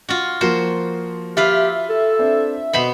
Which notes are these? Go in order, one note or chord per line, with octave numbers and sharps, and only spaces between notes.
F4 F#4
F3 A#3 F#4 C5 C6
F4 G4 B4 E5 F5
A4
C4 D4
B2 B3 C5 D#5 B5